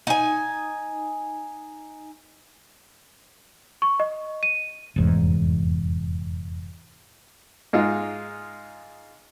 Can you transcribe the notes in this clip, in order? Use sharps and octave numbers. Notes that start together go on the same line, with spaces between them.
D#4 G#5
C#6
D#5
D#7
F1 E2 G#2
G#2 G#3 D#4 F4